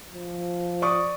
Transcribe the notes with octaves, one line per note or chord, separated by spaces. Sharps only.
F3
D5 C#6 D#6